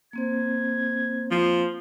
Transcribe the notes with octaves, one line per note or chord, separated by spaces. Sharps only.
A#3 C4 C5 G#6
F3